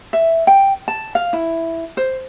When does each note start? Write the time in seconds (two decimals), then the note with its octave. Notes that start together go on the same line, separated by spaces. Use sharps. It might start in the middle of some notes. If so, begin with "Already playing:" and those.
0.13 E5
0.47 G5
0.88 A5
1.15 F5
1.33 E4
1.97 C5